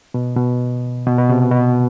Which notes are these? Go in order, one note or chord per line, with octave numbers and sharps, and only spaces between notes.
B2
B2
B2
B2
C3
B2